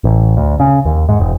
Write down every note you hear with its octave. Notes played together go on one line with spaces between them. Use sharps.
A1
D2
C#3
D#2
G#2
E1